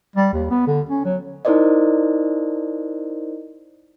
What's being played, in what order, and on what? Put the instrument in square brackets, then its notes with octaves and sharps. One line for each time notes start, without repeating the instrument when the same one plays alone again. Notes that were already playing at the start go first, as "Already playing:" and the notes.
[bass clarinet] G3
D#2
B3
D3
C#4
F#3
[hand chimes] D#4 E4 A#4 C5 D5 D#5